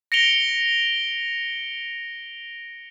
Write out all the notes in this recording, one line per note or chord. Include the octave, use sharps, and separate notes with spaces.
A#6 C#7 D7 F7 G7